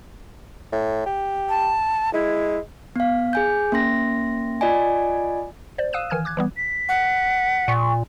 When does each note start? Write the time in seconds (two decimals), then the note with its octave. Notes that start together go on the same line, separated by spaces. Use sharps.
0.72 A2
1.06 G4
1.49 A5
2.14 G#3 E4
2.96 B3 F5
3.33 G#4 G#5 G6
3.72 A#3 C#4 C6 A#6
4.61 F4 D5 D#5 G#5
5.78 C5 D5
5.93 F5 D#6 E6 F#6 D#7 E7
6.10 D#3 E3 G#5 F6 G#6
6.25 D6 F#6 G#6
6.37 E3 G3 B3
6.57 B6
6.89 F#5
7.68 A#2 C#6